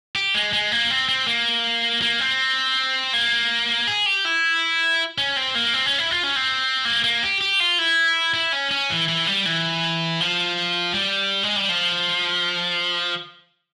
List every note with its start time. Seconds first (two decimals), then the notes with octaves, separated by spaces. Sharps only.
0.16 G4
0.34 G#3
0.53 G#3
0.72 A#3
0.90 C4
1.09 C4
1.27 A#3
2.02 A#3
2.20 C4
3.13 A#3
3.87 G#4
4.06 G4
4.25 E4
5.18 C#4
5.36 C4
5.55 A#3
5.74 C4
5.86 C#4
5.99 E4
6.11 F4
6.23 C#4
6.36 C4
6.85 A#3
7.04 A#3
7.23 G4
7.41 G4
7.60 F4
7.79 E4
8.34 E4
8.53 C#4
8.71 C#4
8.90 E3
9.08 E3
9.27 G3
9.45 E3
10.20 F3
10.94 G3
11.43 G#3
11.56 G3
11.69 F3